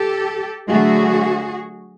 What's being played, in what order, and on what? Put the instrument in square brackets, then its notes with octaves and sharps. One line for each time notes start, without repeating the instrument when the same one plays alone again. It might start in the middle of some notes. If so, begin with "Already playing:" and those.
Already playing: [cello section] G4 A4
D3 F#3 A3 F#4 G#4